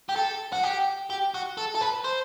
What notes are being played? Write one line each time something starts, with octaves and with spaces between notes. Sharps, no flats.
G4
A4
F#4
G4
G4
F#4
A4
A4
B4
C5